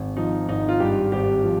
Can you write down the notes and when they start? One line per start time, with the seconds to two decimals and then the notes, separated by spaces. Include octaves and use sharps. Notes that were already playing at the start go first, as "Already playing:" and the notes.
Already playing: G#1
0.17 F3 D#4
0.49 G#1 D#4
0.69 F4
0.80 G2 G4
1.12 G#1 G4
1.44 F3